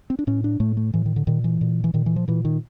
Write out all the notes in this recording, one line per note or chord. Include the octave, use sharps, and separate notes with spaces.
C4
D4
A2 C#4
D4
A2 A3
A3
A2 E3
D#3
D3
A#2 D#3
E3
A#2
E3
A#2 D#3
E3
F3
A#2 E3
D#3